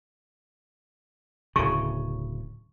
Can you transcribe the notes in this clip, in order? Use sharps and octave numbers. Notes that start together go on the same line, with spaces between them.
D1 C#3 C#6